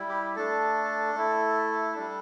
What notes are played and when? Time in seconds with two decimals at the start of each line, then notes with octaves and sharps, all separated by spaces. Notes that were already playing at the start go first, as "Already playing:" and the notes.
Already playing: G3 E4
0.09 G4
0.36 A3 D4 A4
1.15 A3 E4
1.95 G3 D4